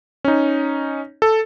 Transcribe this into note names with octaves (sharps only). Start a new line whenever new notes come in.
C#4 D#4
A4